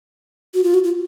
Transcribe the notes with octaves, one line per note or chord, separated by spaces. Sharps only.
F#4
F4
F#4
F4